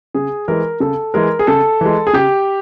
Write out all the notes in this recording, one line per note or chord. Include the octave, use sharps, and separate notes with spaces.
C#3 G#4
E3 G#3 A#4
C#3 A4
E3 G#3 A#4
G#4
C#3 A4
E3 G#3
G#4
C#3 G4